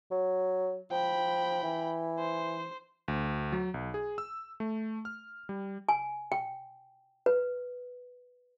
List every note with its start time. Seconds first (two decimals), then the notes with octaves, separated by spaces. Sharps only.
0.11 F#3
0.92 F3 G5 B5
1.63 E3
2.19 C5
3.08 D2
3.52 F#3
3.74 B1
3.94 G#4
4.18 E6
4.60 A3
5.05 F6
5.49 G3
5.89 G#5
6.32 G5
7.26 B4